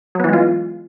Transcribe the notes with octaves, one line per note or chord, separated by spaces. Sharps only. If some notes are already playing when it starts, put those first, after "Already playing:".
E3 F#3 G#3 B3 F4